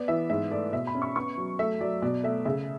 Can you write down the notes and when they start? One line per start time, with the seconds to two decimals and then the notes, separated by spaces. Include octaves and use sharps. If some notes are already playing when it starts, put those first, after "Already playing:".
Already playing: B3 D5
0.08 E3 E5
0.30 G#2 E5
0.51 A3 D5
0.73 B2 E5
0.87 B5
0.95 C#4
1.02 C#6
1.16 B3 C#6
1.38 F#3
1.59 A3 E5
1.81 F#3 D5
2.02 B2 D5
2.23 A3 E5
2.45 C#3 E5